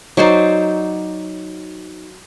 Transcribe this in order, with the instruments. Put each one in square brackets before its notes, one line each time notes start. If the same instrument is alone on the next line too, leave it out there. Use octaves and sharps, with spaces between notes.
[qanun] F#3 D#4 C5 D5